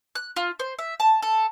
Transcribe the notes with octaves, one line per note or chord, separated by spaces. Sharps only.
F#6
F4
C5
E5
A5
A4